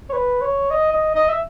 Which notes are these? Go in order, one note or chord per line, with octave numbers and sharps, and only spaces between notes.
C#5
B4
C#5
D#5
D#5
D#5
E5